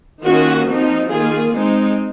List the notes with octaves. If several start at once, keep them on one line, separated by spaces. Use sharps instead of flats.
D#3 A#3 C#4 F4 F#4
F3 C4 D#4
D#3 A#3 F4 G#4
G#3 C4 D#4